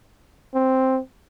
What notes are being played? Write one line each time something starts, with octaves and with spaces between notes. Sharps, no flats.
C4